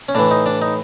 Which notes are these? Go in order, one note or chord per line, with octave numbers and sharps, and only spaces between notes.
C#4
A2 E3 D4
D#4
D4
D#4